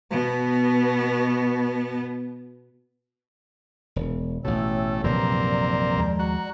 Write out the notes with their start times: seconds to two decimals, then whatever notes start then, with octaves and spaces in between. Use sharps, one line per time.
0.11 B2 B3
3.96 E1
4.45 A1 B2 A3 C#5 G5 E6
5.04 A#1 F#2 C3 E3 A#3 C4 D5 A#5
5.97 D#2 F3 G#3
6.19 F#4